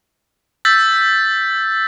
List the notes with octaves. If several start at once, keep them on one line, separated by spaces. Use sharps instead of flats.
E6 G6 A6 B6